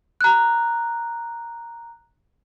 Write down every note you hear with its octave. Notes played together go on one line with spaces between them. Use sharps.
A#5 F#6